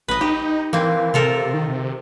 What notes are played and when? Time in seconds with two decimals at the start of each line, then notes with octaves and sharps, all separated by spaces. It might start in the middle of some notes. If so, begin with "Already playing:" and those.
0.08 A#1 B4 D#5
0.21 D#4 G4
0.73 E3 A#3 C4
1.14 C3 F4 A4 A#4
1.54 D#3
1.68 C3